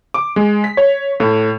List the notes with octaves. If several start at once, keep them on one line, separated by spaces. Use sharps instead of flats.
D6
G#3
B6
C#5
A2